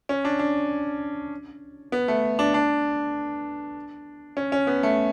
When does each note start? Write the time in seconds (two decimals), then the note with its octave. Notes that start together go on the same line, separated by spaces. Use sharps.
0.09 C#4
0.25 D4
0.39 D4
1.92 B3
2.08 A3
2.39 D4
2.54 D4
4.37 C#4
4.52 C#4
4.67 B3
4.83 A3